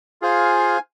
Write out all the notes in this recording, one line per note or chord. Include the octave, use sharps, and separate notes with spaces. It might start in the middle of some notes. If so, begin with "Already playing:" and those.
F4 G#4 C5 F5 G#5